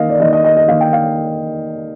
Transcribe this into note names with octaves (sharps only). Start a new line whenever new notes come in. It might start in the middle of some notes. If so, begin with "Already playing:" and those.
Already playing: D#3 A#3 D#5 F5
D5
D#3 A#3 D#5
D#5
D#5
D#5
D#3 A#3 F5
G5
F5